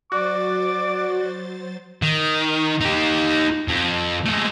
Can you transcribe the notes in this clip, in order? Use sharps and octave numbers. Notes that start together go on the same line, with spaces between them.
F#3 F#4 C5 D5 D6 A6
D#3
D#4 G4
F2
G#3 A3